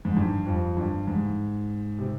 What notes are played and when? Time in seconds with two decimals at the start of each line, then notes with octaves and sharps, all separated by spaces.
0.05 G#2
0.17 G2
0.46 F2
0.77 G2
1.07 G#2
1.99 C3